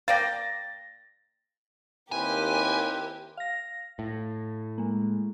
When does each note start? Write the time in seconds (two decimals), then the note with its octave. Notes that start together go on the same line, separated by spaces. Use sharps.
0.08 A#3 D5 F5 G5 A6 A#6
2.12 D#2 C4 E4 G4 A#4 B4 G#5
3.37 F5 A#6
3.99 A2
4.78 G#3 A#3